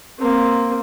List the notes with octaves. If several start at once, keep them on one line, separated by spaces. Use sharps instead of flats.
A#3 C4